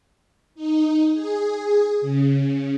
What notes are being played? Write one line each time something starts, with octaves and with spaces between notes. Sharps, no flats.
D#4
G#4
C#3